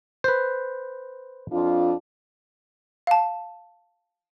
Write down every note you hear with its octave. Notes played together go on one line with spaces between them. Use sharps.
B4 C5
F2 D4 F4
F5 A5